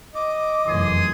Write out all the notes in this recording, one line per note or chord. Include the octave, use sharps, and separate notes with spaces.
D#5 D6
F1 F#2 E3 G#4 C6 D#6